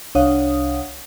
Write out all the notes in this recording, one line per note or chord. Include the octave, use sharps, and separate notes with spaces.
C2 D4 C#5 F5 F#5 D#6